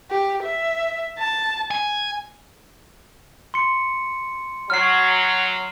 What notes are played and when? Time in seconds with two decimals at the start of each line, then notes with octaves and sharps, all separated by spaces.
0.11 G4
0.44 E5
1.19 A5
1.71 G#5
3.54 C6 C#7
4.70 F#3 F6 C7